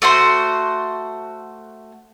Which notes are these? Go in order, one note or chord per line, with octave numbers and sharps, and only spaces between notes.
A3 F#4 C5 C6